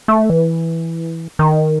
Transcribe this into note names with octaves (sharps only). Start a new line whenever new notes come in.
A3
E3
D#3